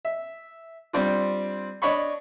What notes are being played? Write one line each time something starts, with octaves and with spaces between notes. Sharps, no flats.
E5
G3 C4 D4 F4
D4 C#5 D#5 B5 C#6